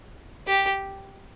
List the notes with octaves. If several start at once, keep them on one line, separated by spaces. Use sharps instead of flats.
G4